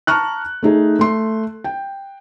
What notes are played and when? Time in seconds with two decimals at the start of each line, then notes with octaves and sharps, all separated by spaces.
0.07 A5 A#5 C#6 F6 F#6
0.63 A3 D#4 G#4
0.99 A3 C6
1.64 G5